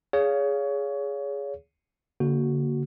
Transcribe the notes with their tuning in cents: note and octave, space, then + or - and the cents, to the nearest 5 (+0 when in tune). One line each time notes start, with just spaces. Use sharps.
G#4 +0 C#5 +25 F5 +0
D3 -40 A#3 +0 F#4 +0